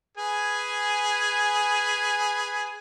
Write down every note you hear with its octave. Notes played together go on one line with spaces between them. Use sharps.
G#4 B4 G#5